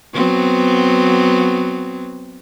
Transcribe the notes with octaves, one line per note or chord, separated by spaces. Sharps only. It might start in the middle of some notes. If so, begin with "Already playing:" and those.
F#3 B3 C4